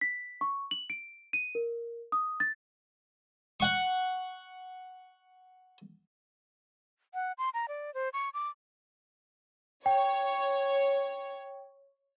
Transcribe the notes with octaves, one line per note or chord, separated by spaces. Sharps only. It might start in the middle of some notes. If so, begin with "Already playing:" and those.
B6
C#6
F#7
D7
D#7
A#4
D#6
A6
F#5 C#6
F#5
C6
A#5
D5
C5
C#6
D6
C#5 G5